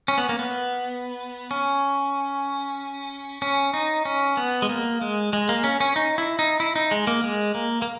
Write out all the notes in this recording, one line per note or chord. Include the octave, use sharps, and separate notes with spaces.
C#4
B3
A#3
B3
C#4
C#4
D#4
C#4
B3
G#3
A#3
G#3
G#3
A#3
C#4
C#4
D#4
E4
D#4
E4
D#4
G#3
A#3
G#3
A#3
A#3